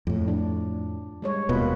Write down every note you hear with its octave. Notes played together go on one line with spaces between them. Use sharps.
F2 A2
D4
G3 G#3 C#5
D#1 B2 A#3 F4 B4